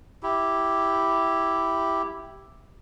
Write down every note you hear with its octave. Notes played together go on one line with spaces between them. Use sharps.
E4 G4